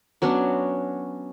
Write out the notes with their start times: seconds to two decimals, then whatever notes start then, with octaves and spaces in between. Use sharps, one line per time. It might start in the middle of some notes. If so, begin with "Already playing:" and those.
0.22 F#3 B3 C#4 D4